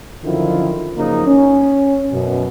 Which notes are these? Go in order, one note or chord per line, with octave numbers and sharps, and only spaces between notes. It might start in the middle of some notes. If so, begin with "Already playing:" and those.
F#2 D3 D#3 F3 E4 F4
F#2 C#3 F3 A#3 D#4
C#4
F#2 B2